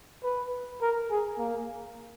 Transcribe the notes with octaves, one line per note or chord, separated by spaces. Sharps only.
B4
A#4
G#4
A#3